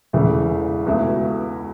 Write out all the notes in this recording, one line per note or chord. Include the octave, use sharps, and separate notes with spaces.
E1 E2 C#3 E3 A3
C#2 B2 A3 E4